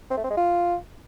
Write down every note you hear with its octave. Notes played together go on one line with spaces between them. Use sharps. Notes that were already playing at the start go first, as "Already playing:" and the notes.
C4
A3
C4
G#3
F4